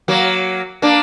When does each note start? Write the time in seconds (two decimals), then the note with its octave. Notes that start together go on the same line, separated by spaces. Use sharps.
0.08 F#3 A#3
0.82 A#3 D4